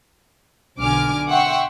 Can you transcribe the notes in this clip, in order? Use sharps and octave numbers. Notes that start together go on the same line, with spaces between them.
B1 D3 G#5 D6 F6
E5 F#5 G5 C6 C#6 E6